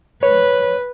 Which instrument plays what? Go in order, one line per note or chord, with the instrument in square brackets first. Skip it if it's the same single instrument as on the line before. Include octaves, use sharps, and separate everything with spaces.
[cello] B4 [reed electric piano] C#5